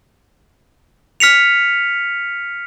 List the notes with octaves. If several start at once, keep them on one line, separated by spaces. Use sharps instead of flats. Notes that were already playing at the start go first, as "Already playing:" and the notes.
F6 B6 C#7 F7